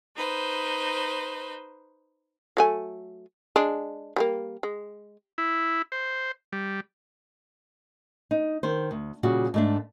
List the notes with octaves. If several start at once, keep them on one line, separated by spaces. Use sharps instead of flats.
D#4 B4 C5
F#3 A3 G#5
G#3 D4
G3 G#3 A#3
G#3
E4
C5
G3
D#4
D#3 C5
D2
A#2 C#3 G3 F#4
G#2 A3 D4